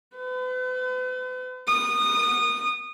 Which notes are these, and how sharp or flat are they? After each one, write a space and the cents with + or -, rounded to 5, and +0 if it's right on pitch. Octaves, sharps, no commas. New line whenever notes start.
B4 +45
D#6 -20